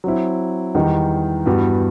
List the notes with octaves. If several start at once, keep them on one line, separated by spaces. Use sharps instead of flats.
F#3 C4 E4
E2 D#3 G3 D#4
G2 E3 G3 B3 F#4